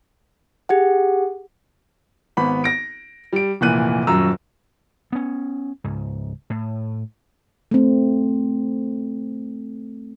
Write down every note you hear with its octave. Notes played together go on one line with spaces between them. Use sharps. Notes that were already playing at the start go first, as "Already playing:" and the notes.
G4 G#4 F#5
G#1 B3 B5
A#6 D7
G3 D7
F1 A#2 E3 F#6 D#7
D#1 F#2 F#3 A#5 E6
B3 C#4
C#2 G#2
A2
A3 C4